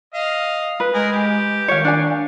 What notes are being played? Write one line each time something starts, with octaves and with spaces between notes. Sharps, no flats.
D#5 F5
B4
G#3 D#4 G#4 A#4
G4
D#3 C#5 F5
D4 F5 G#5